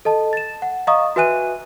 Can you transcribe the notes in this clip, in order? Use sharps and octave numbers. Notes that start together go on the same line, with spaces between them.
A4 D#5 A5
A6 E7
F#5
D#5 F5 A#5 C#6 D#6
F#4 B4 E5 G#5 F#6 D#7